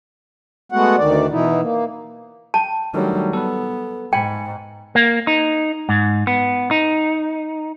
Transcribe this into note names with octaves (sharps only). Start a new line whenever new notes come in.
G#3 A3 B3 F#4 F#5
D2 D#3 D5
B2 E3 D#4 E4
A#3
G5 A5
D#3 F#3 G3 A3 D4
B3 A4 B4
G#2 G5 G#5 B5
A#3
D#4
G#2
B3
D#4